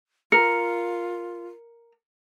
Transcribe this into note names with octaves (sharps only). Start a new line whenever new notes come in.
F4 A#4 C#7